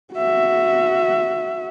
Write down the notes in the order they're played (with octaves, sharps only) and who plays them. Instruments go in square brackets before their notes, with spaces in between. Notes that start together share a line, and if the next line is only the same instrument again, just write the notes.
[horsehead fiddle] F#4 E5